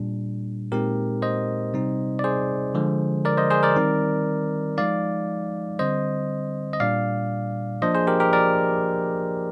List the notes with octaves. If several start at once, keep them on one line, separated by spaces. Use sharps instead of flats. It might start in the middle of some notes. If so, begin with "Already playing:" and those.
Already playing: A#2 G3 D4
A#2 G#3 C4 D#4 G4 A#4
C5 D#5
C3 G3 C4 D#4
D5
G#4 C5
D3 F3 G#3
A#4 D5
C5 D#5
G#4 C5
A#4 D5
D#3 G3 C4 D#4
F3 G#3 D#4 D5 F5
D3 G3 C4 C5 D#5
D#5
A#2 G3 D4 D5 F5
F3 A#3 D4 C5 D#5
G#4 C5
G4 A#4
G4 A#4
A#4 D5